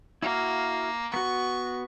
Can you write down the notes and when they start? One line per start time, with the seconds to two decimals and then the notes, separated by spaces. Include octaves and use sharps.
0.22 A#3 E4 F#4 F5
1.14 B3 F#4 C#6